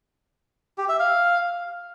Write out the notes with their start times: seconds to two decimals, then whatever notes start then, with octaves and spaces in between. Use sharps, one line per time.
0.78 G4
0.89 E5
1.00 F5